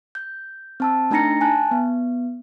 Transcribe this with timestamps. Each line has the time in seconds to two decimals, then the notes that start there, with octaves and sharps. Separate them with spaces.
0.15 G6
0.80 C4 A5 E6
1.11 A3 D4 D#4 A#5 A#6 C#7
1.41 G#5 A5 F#6
1.71 B3